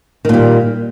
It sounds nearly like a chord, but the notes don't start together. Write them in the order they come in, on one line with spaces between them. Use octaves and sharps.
D#3 A#2 G3